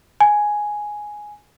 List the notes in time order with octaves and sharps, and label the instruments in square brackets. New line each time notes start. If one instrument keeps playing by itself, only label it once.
[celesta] G#5